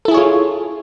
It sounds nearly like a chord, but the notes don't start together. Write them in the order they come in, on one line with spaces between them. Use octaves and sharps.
A4 E4 G#4 C#5 F4